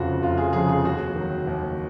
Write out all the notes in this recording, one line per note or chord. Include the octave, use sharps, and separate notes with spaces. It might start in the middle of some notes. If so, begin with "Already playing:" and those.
Already playing: F1 F2 C#3 F3 F4 F#4
F1 F4
G#4
F2 C#3 F3 G#4
G#4
D#2 F#4
D#3 F#3
D#2